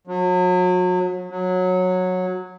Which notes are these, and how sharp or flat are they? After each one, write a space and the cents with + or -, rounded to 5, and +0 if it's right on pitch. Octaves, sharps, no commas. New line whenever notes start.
F#3 -35
F#3 -15